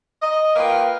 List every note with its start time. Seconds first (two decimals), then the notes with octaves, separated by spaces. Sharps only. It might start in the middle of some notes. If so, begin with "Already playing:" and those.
0.23 D#5
0.56 A#3 F4 A#4 B4 G5